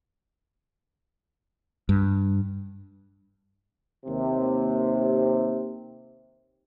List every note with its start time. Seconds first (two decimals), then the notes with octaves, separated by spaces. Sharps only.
1.89 G2
4.06 D#2 C3